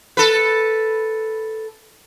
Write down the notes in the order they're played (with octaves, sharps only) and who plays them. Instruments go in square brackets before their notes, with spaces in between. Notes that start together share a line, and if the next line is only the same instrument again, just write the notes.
[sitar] A4 B4